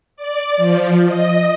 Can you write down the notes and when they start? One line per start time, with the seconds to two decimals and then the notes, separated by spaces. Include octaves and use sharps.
0.17 D5
0.57 F3
1.06 D#5